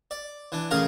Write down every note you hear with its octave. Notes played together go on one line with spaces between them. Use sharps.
D5
E3 D4
A1 C#3 G#4 A#4 F5 A#5